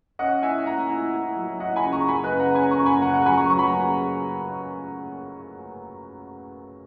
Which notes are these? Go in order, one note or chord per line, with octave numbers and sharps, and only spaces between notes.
C#4 D#5 F#5
E4 E5 G#5
C#4 F#5 A#5
E4
E4
F#3
E4 D#5 F#5
G#5 B5
C#3
A#5 C#6
F#2 G#5 B5
B4 D#5
C#3
F#5 A#5
C#4 G#5 B5
A#5 C#6
F#2
G#5 B5
C#3 F#5 A#5
F#5 A#5
F#3 G#5 B5
A#5 C#6
F#3 C#6
B5
A#5
C#3